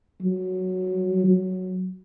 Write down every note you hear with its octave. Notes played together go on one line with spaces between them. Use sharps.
F#3
F#3